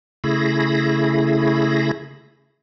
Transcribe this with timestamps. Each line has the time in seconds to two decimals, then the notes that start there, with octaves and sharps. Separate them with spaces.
0.24 C#3 A3 E4 G#4 B5 A#6